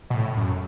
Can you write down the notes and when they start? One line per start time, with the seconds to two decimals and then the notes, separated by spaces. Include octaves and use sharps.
0.10 B2
0.14 A2
0.37 F#2